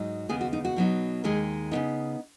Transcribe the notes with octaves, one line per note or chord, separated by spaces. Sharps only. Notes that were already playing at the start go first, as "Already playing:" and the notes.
Already playing: G#2 F#3 D#4
D#2 C#3 B3 G#4
F#4
D#4
F#4
B2 F#3 B3 D#4
D#2 D#3 G#3 G#4
C#3 B3 D#4